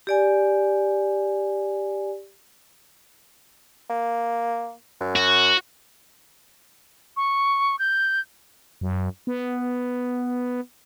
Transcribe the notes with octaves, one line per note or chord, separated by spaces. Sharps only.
G4 D5 G#5
A#3
F#2
F#4
C#6
G6
F#2
B3